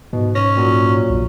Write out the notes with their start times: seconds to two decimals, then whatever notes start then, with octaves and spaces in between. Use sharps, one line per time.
0.13 G#2 B2
0.35 C#4 A#6
0.57 A#2 F#3
1.10 A#1